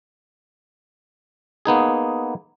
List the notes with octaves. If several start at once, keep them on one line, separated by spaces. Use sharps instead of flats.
A#3 B3 D#4 G#4